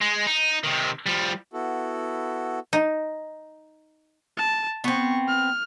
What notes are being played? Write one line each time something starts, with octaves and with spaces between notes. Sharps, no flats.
G#3
D#4
C3 D#3
F3 G3
B3 E4 F#4 A4
D#4
A5
B3 C4 C#6
F6